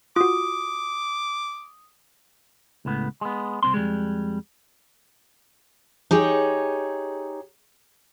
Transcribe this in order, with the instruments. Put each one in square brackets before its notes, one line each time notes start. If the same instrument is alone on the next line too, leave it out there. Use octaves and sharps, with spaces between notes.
[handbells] F4 F#4 [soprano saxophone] D6 [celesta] D#6
[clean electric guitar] C#2 A2 B3
G#3 B3
C2 F#2 C4 C6
F2 E3 G3 G#3
[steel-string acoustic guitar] D#4 G4 G#4 C#5